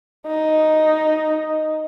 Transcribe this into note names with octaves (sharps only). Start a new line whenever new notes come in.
D#4